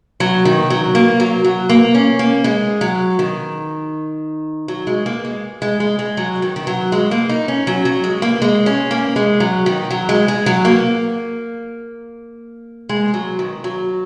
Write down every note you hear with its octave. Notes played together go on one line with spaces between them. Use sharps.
F#3
D#3
F#3
A#3
F#3
F#3
A#3
C#4
A#3
G#3
F#3
D#3
F#3
G#3
A#3
G#3
G#3
G#3
G#3
F#3
D#3
D#3
F#3
G#3
A#3
D#4
C#4
F#3
F#3
G#3
A#3
G#3
C#4
A#3
G#3
F#3
D#3
F#3
G#3
G#3
F#3
A#3
G#3
F#3
D#3
F#3